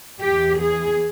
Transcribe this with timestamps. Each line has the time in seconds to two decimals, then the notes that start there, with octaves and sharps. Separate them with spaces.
0.21 E2 E3 G4
0.61 G#4